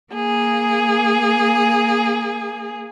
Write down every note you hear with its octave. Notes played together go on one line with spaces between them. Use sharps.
A#3 G#4